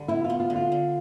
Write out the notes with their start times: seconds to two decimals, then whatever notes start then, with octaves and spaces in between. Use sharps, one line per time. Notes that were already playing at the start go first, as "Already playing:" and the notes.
Already playing: D3 G3
0.08 B3 E4
0.24 F4
0.30 B3
0.40 F4
0.50 D3
0.56 F4
0.72 D3